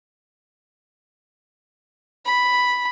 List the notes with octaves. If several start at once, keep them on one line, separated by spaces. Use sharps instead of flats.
B5